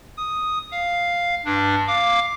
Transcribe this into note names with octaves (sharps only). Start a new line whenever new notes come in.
D#6
F5
G2 D4
F5 D6